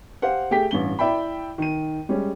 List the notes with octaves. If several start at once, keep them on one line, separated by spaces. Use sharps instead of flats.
G4 C5 F5 F#5
A3 G4 G#4 G5 B6
A1 G2 G7
E4 D5 E5 G5 B5
D#3 D#7
G3 G#3 C#4